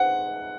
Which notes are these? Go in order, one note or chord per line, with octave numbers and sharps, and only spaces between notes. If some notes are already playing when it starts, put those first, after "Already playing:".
Already playing: D#4 G#4 C5 F#5